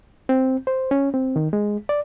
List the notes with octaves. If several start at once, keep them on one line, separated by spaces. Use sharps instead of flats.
C4
C5
C#4
C4
D#3
G#3
D5